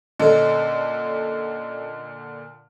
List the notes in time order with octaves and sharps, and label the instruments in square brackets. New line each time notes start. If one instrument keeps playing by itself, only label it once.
[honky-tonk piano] A#2 D3 [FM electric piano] C#4 A4 [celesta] D#5